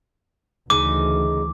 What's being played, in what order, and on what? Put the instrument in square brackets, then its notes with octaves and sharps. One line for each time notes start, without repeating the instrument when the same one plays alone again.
[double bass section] D2 E3 [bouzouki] C#3 D#4 [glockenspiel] D6